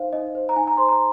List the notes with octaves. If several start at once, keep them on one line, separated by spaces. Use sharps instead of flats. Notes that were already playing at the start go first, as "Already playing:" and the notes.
Already playing: D#4 C5 F5
D#4 D#5
C5
A#5
D#4 G#5
A#5
C5 C6
A#5